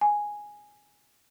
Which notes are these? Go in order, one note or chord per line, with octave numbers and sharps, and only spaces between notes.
G#5